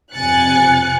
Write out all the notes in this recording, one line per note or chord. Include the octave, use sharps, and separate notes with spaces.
F2 C3 G#5 F#6 A6 C#7